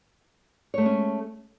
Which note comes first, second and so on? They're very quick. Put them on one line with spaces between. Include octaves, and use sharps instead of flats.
C#5 A3 G#3 C#4